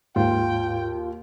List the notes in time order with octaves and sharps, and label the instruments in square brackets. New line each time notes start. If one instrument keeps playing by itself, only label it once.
[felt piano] D#2 [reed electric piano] G#2 [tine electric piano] F4 [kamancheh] G5